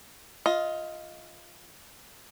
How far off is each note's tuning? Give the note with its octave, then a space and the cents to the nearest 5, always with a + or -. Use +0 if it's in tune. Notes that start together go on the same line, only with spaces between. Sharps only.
F4 +0 D#5 +20